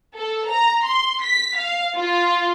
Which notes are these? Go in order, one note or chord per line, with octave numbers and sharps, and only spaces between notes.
A4
A#5
C6
B6
F5
F4